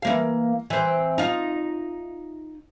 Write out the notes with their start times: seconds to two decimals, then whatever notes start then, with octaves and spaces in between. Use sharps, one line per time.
0.02 E3 A#3 F5
0.70 E3 C4
1.18 D#4 F4